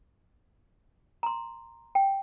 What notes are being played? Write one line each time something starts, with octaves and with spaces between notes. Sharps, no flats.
A#5 C6
G5